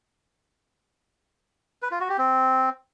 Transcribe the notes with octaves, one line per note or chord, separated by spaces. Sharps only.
B4
F4
F#4
G4
C4